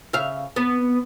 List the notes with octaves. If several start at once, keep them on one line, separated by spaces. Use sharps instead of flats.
C#3 E5 F5
B3